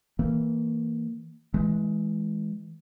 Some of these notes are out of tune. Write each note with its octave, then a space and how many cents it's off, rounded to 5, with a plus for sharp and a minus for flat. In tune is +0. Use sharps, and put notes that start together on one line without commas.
E3 -20 A#3 -20
E3 -15 G#3 +15